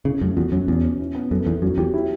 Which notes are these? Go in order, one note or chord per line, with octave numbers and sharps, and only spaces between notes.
C#3 E4
F#2 A3
E2 F#4
F#2 C#4
E2 B2
C#4
E4
B3
F#2 A4
E2 E4
F#2 F#3
E2 G4
E4